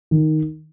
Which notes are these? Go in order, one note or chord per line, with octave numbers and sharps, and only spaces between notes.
D#3